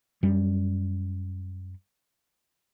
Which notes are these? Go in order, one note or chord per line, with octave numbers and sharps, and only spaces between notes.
F#2 G3